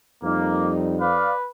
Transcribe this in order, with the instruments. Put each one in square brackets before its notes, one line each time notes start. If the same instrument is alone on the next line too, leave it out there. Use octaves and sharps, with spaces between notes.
[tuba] F2 [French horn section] G3 D#4 [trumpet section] A#3
[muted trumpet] B4 [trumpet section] D5 F5